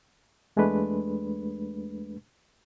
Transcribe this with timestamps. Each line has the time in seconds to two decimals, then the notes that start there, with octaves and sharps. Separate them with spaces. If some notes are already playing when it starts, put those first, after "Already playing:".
0.56 E2 G#3 A3 D4 B4